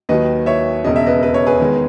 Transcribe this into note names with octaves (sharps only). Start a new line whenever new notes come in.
D#2 D#3 F#3 B4 D#5
C#5 E5
E1 E2 C#3 D#5
E5
B4 D#5
B4
C#5
G#4 B4
E2 D#3 G#3